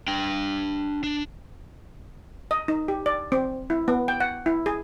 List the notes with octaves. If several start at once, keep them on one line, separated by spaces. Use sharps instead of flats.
D4 G5
D4
D#5
D#4
G4
D5
C4
E4
B3
G5
F#5
E4
G#4